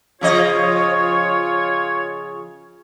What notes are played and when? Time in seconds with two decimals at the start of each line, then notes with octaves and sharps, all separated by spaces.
0.21 C#3 F3 F4 C#5 D#5